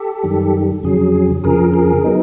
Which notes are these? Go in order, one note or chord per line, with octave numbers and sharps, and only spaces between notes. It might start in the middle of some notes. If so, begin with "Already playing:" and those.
Already playing: G4 A4
F#2 D#3 G3
F2 C#3 F#3 G#4
F2 C#3 F3 G#4 A#4
G#4 A#4
F#3 B3 D#4